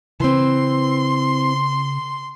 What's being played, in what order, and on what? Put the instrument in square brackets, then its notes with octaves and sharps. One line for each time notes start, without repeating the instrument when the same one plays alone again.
[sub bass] C#3 [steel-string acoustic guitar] E3 C4 [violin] C6